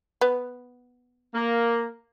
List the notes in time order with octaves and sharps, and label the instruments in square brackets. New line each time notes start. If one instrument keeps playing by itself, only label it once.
[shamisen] B3
[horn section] A#3